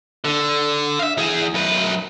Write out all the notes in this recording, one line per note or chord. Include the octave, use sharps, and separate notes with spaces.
D3
E5 F5
E3 G#4
F#2 B4